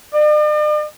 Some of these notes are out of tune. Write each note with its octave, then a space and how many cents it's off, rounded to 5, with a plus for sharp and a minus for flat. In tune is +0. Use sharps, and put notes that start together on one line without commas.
D5 +45